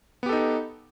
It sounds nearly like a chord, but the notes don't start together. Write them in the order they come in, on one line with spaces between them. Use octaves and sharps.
B3 G4 A4 D#4